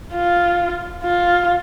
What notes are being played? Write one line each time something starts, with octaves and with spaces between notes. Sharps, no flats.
F4
F4